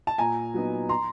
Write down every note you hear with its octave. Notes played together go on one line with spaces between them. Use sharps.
A5
A#2 G#5 A#5
F#3 B3 D#4
A#5 C6